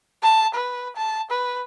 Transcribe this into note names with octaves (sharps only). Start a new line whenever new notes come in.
A5
B4
A5
B4